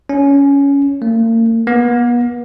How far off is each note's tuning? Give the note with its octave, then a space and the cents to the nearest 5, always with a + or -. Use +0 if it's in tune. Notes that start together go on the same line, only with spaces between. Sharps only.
C#4 +15
A#3 -40
B3 -40